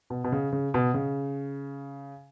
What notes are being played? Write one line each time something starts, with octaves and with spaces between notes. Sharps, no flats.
B2
B2
C#3
C#3
B2
C#3